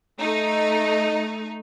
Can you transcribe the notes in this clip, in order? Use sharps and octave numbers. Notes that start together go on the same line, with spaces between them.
A3 D#4 D#5